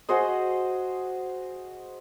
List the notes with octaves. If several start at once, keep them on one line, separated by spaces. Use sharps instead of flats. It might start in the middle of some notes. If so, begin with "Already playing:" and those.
F#4 G#4 C5 D#5